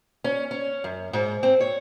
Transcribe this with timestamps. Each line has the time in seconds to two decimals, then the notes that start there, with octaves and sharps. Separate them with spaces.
0.24 C#4
0.51 C#4
0.84 F#2
1.13 G#2
1.43 C4
1.60 C#5